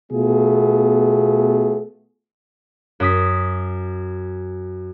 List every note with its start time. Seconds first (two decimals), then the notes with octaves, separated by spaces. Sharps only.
0.11 B2 A3 B3 F4 G#4
3.00 F#2 D#6 B6